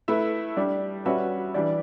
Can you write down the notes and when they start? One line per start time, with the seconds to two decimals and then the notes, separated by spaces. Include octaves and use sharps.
0.08 A3 E4 B4 E5
0.57 G3 D4 G4
1.05 G3 C#4 F#4 B4 E5
1.54 E3 G3 D4 G4 D5